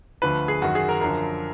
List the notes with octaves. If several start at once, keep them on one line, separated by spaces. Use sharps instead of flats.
D2 D3 F3 B4
G#4
F#2 D#3 F#4
G#4
A#4
F#2 D3 F3 A#4